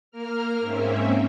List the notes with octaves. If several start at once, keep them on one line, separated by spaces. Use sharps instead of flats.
A#3 A#4 F6
G#2 A#3 C4 C#4 E5